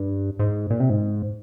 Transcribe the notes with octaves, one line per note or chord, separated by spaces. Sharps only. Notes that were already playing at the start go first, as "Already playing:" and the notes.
Already playing: G2
G#2
A#2
C3
G#2